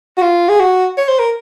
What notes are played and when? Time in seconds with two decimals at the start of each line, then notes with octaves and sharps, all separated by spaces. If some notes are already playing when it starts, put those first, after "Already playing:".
0.17 F#4
0.22 F4
0.49 G#4
0.60 F#4
0.97 C#5
1.08 C5
1.19 A#4